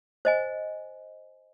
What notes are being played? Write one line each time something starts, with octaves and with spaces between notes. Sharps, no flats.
C5 D#5 G#5